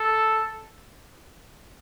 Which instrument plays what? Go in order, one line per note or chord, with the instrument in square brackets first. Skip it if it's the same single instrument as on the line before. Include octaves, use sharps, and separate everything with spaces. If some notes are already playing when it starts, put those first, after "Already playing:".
Already playing: [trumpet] A4